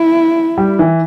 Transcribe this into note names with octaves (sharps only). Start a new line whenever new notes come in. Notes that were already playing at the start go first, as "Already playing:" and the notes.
Already playing: E4
G3
E3